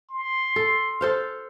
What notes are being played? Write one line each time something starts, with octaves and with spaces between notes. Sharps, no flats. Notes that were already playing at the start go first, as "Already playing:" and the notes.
C6
A4
A4 C5 F5